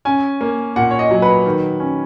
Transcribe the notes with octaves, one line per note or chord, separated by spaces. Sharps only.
C#4 G#5
A#3
A#2 F#5
C#5
D#5
F#3
B4
D#3
C#4